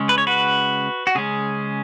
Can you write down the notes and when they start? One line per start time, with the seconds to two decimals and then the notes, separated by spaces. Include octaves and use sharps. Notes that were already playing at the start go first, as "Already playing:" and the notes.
Already playing: C#3 G#3 C#4
0.09 B4
0.18 C#5
0.27 F#4 B4
1.07 F#4
1.15 C#3 G#3 C#4 G#4